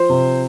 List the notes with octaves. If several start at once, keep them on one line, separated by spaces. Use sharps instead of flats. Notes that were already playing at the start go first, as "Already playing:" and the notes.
Already playing: F3 C5
C3